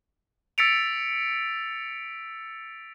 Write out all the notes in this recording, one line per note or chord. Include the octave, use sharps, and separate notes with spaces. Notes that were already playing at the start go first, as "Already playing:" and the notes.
E6 A6 B6 C#7 D7 F7